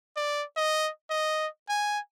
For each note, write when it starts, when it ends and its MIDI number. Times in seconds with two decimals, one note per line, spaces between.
0.17 0.44 74
0.57 0.90 75
1.10 1.47 75
1.69 2.00 80